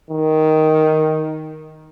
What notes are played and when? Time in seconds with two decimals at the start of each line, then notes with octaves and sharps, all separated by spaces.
0.10 D#3